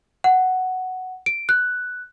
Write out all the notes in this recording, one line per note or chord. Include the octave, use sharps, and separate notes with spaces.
F#5
D7
F#6